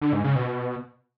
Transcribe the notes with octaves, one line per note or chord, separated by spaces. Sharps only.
D3
G#2
C#3
B2